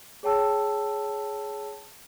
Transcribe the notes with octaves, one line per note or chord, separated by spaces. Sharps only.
G#4 C#5 G5 A5 E6